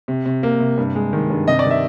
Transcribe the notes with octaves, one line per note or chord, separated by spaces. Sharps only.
C3
C3
A#3
C3
G2
G#3
D#3
G2
C3 D#5
D5
D#3
E5